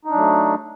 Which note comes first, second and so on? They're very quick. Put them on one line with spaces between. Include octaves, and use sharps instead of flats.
D#4 D4 F#3 A3